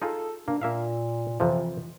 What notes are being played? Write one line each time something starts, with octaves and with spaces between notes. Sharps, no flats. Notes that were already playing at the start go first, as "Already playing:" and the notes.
D#4 F4 G#4 A4
A#3 D4
A#2 A#3 E5 F5
F2 C3 E3 F3